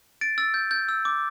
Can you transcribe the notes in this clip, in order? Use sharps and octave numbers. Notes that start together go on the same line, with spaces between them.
A6 D7
E6 A6
G6
G6
E6
D6